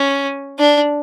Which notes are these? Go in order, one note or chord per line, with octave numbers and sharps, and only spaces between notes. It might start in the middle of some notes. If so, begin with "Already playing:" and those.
Already playing: C#4
D4